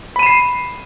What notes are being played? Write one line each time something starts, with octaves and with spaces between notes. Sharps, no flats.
B5 C7 D#7 E7